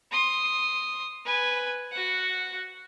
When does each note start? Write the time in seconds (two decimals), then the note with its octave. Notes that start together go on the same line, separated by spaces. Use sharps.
0.11 C6 D#6
1.25 B4 G#5
1.92 F#4 F#5